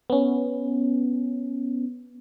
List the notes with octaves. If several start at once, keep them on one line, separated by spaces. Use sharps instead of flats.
B3 C#4